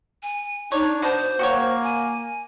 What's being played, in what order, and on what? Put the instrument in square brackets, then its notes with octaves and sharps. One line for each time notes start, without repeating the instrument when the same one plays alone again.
[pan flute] G#5
[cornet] D4 [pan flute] D#4 [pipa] C#5
[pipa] B2 [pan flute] C5
[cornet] A#3 [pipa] F#4 G4 C#5
[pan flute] G#5